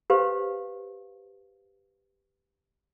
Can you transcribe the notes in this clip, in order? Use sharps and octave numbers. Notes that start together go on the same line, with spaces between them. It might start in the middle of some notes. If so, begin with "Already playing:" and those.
G4 B4 C5 F5 C6